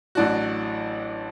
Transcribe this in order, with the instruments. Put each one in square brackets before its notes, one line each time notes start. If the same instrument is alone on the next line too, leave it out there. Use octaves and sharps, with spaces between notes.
[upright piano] A1 A2 F#3 D4 F#4